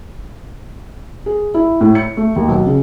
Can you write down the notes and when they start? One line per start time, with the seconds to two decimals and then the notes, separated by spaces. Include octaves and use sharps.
1.26 G#4
1.54 E4
1.81 A2
1.95 C#7
2.17 A3
2.36 D#2
2.48 B1
2.66 C#3